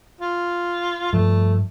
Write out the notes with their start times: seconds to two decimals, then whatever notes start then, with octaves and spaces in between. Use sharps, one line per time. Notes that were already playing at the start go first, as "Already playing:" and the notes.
0.21 F4
1.13 G2 F3 A3